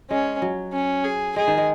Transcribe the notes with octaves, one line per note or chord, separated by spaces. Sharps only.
G#3 C#4
F#3
C#4
G#4
G#3 G#4
D#3
G#3